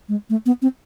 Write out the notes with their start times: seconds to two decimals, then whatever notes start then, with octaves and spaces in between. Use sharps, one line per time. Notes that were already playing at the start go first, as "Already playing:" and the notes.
0.09 G#3
0.30 A3
0.46 B3
0.62 C4